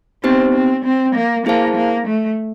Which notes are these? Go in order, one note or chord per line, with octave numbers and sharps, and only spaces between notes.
B3 C4 D#4 G4 C5
C4
C4
A#3
A#3 E4 G#4 C5 F5 A5
A#3
A3